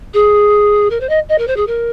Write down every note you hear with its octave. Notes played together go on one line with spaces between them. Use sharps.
G#4
A#4
C5
D#5
D#5
A#4
C5
G#4
A#4